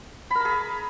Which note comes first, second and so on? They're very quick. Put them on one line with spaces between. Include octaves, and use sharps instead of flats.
B5 A#4 A5 G#4